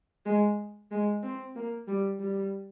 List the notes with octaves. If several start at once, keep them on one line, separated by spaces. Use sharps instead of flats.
G#3
G#3
C4
A#3
G3
G3